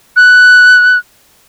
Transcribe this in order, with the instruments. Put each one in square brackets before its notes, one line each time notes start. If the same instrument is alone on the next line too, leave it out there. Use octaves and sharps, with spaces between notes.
[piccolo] F#6